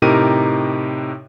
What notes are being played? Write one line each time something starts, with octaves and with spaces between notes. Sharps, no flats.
A2 C3 D#4 G4 A#4 D#7